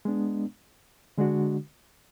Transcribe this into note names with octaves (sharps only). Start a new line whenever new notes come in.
G#3 B3 D4
D3 G#3 D4 F#4